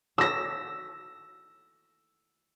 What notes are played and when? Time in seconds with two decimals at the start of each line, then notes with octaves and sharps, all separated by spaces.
0.18 E6 A#6